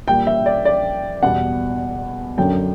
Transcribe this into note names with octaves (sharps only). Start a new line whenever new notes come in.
A#2 G3 G5
E5
D5
D5
E2 B2 G3 F#5
F#2 D3 F#3 G5